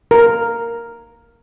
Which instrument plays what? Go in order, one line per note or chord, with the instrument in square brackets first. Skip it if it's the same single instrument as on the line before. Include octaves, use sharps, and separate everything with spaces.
[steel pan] A#4